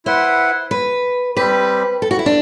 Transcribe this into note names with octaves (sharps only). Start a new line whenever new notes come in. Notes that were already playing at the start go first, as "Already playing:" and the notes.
E4 B4 C5 F#5
B4
G3 C4 G4 B4
A4
F#4
E4
D4